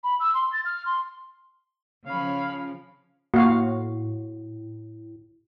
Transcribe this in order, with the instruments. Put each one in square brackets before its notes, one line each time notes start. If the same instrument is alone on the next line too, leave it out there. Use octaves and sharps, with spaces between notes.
[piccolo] B5
E6
C6
A6
F6
C6
[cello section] C#3 F3 [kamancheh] C#5 B5 [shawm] F5
[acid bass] A2 [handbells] A#3 [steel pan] F#4 F5